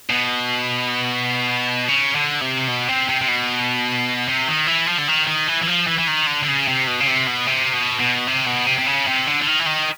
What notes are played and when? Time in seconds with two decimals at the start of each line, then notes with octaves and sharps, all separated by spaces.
0.10 B2
1.89 C#3
2.15 D3
2.41 C3
2.68 B2
2.89 C3
3.09 C3
3.21 C3
3.28 B2
4.29 C3
4.48 D#3
4.68 E3
4.88 F3
4.99 D3
5.08 D#3
5.27 D#3
5.48 E3
5.62 E3
5.67 F3
5.87 E3
5.99 E3
6.07 D#3
6.27 D3
6.43 D3
6.48 C#3
6.68 C3
6.87 B2
7.01 C#3
7.08 C3
7.28 B2
7.47 C3
7.73 B2
8.00 B2
8.28 C3
8.47 B2
8.67 C3
8.79 C3
8.87 C#3
9.08 C3
9.27 D3
9.42 D3
9.47 D#3
9.60 E3
9.66 D#3